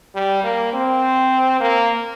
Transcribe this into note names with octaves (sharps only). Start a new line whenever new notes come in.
G3
A#3
C4
A#3